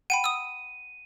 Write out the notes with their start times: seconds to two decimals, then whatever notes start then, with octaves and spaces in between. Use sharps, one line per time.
0.10 F#5 G5 B5 D#7
0.24 D#6 E6